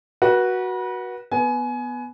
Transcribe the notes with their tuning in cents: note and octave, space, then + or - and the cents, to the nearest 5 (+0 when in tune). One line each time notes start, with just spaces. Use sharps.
F#4 +0 B4 -35
B3 +0 G#5 +25